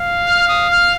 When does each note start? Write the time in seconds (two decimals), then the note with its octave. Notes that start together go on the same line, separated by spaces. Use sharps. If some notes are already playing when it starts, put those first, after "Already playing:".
Already playing: F5
0.27 F6
0.49 D#6
0.70 F6